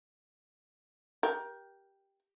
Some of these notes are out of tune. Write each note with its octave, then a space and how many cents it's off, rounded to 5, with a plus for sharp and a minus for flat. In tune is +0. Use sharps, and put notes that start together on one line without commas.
G4 +0 A#4 +25